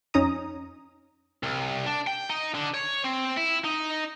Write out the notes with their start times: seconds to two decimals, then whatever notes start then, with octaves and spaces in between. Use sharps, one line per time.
0.14 F2 C#4 D#4 A#5 D#6
1.43 C2
1.87 D4
2.07 G5
2.29 D#4
2.55 D3
2.74 C#5
3.04 C4
3.37 E4
3.64 D#4